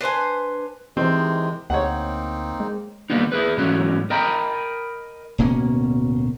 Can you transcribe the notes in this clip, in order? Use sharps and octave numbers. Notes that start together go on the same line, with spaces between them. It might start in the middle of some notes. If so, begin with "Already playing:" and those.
D4 B4 C5 G#5
C3 D#3 E3 G#3 C4
D2 A#3 C4 D#4 C#5 F#5
G#3
D#3 G3 A#3 B3 D#4
E4 G#4 B4
G#2 E3 F#3 A3 C#4
A#4 D#5 G5 A#5 B5
D1 B2 A#3 C#4